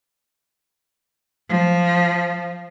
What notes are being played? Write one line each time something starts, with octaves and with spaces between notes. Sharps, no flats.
F3